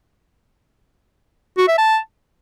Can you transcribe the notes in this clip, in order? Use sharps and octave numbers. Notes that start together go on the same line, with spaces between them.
F#4
E5
A5